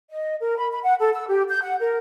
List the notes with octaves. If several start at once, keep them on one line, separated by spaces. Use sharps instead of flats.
D#5
A#4
B5
B5
F#5
A4
E6
G4
G6
F#5
A#4